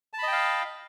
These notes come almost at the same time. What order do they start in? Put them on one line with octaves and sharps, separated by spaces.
A5 B5 D#5 G5 F5